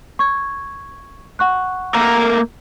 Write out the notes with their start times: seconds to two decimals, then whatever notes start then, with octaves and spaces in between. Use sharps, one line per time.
0.19 C#6 G#6
1.39 F#5 C#6 F#6
1.94 A3 A#3 A#4